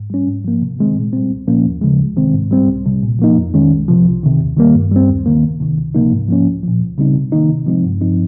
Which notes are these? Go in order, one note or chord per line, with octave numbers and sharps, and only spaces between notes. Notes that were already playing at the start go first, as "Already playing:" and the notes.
Already playing: G#2
G3 C#4
G#2
F3 A#3
C3
D#3 G#3 C4
A#2
G3 C4
C2
A#2 F3 A#3 C#4
D#2
C#3 F3 G#3
C#2
C3 D#3 G#3 C4
G#2
G3 C4
C2
C3 G3
A#2
F3 A#3 D#4
F2
D#3 G#3 C#4
C2
C3 F3
C2
C3 D#3
D#2
D#3 G3 A#3
G2
G3 C4
D#2
D#3 A#3
C#2
C3 D#3
C#2
C3 F3 A#3 D#4
G#2
F3 A#3 C#4
C2
A#2 F3
C#2
C#3 G3 C4 D#4
C3
D#3 A#3 D#4
C3
F3 G#3 C4 D#4
G2
F3 C4 D#4